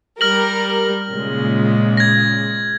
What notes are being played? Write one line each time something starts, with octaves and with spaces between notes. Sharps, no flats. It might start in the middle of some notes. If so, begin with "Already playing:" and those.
G3 A#4 F6 A#6 F#7
A#2 C#3 G#3
G#6 A#6